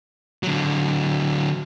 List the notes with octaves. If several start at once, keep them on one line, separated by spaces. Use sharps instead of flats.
D3 F#3